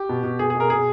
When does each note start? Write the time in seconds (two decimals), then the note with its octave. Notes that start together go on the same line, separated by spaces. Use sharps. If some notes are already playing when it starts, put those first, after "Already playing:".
Already playing: G4
0.09 B2
0.23 B2
0.39 B2 G#4
0.50 G#4
0.55 B2
0.60 A#4
0.70 B2 G#4